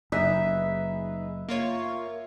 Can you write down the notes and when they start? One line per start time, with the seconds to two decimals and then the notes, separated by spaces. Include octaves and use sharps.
0.12 F#1 D#4 G#4 B4 E5
1.48 A#3 F4 C#5